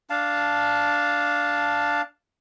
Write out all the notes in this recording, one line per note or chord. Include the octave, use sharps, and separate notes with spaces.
D4 F5 A5